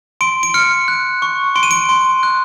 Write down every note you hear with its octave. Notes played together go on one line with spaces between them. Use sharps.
C6 D7
D7
F6 C#7
F#6
C#6
C6 D7
D#7
D7
C6
F#6